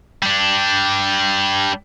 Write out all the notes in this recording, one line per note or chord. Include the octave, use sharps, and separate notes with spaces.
G3 D4